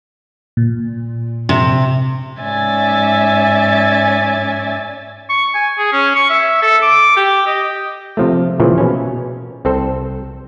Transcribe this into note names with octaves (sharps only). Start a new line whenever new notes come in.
A#2
C3
G#2 C#4 D5 E5 G#5 A6
C#6
G#5
G#4
C#4
C#6
E5
A4
D6
G4
D#5
C3 F3 A3
A#2 C#3 E3 F3
B2 C#4
C2 C4 A4 C5